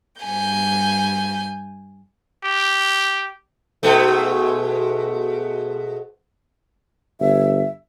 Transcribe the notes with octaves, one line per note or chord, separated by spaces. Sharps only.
G2 G#5 G6
G4
G#2 B2 A3
G1 E5